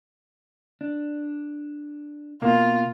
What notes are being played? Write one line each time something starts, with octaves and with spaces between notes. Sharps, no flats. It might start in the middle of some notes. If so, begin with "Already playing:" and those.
D4
B2 A#3 F4